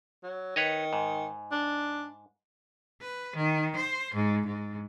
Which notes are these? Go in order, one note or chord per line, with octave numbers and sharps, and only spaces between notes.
F#3
D#3 B4 C#5 D#5
G#2
D4
B4
D#3
C5
G#2
G#2